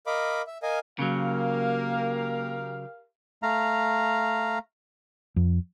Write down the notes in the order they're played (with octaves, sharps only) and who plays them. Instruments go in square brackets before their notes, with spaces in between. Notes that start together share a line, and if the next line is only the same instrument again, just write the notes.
[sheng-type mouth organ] A#4 D#5 F5 B5 D6
E5
A#4 D#5 F5 G#5
[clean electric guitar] C#3 F#3 [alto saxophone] A#3 [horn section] G4 A#4 F5
[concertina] A3 F5 A#5
[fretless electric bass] F2